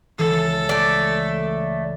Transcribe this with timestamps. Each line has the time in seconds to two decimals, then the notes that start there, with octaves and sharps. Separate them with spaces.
0.19 C#2 E3 A4
0.69 A3 D5